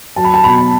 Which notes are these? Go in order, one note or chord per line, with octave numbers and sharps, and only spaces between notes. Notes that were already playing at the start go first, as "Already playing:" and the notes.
F#3 A5
B5
A5
B2 B5